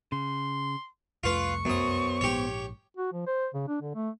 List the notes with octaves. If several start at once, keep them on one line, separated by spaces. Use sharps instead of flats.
C#3 C6
C2 F2 A3 F4 B4 C#6
F#2 B3 C5 D#6
A#1 G#2 G4 C#5
F#4
F3
C5
C#3
D4
D3
A3